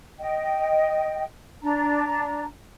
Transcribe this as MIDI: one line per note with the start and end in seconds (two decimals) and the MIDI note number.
0.20 1.23 75
0.20 1.23 79
1.62 2.45 62
1.62 2.45 82